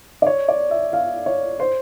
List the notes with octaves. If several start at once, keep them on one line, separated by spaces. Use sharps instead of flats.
D5
C#5
D5
E5
F5
C#5
C5